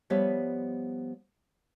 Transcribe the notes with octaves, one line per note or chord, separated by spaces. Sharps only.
F3 G3 B3 C#5 E5